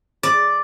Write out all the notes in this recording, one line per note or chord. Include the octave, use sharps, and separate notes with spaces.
D5